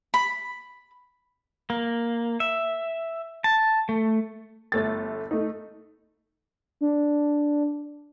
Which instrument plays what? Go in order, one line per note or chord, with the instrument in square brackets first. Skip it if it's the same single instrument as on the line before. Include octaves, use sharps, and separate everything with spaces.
[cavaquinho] B5
[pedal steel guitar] A#3
E5
A5
A3
[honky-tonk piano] G1 A3 A6
A3 D#4
[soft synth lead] D4